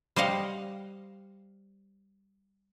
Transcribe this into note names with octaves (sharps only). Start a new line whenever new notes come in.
G3 C5 D#5 F5 F#5